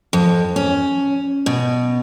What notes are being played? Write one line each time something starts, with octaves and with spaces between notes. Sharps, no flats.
F2
C#4
B2